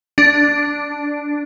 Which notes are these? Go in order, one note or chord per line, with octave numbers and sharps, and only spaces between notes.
D4